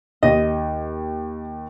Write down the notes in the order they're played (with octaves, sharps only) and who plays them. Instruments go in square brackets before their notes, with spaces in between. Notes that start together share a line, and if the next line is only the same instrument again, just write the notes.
[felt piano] D#2 [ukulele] D#5